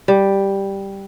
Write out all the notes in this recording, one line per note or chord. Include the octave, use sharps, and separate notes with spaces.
G3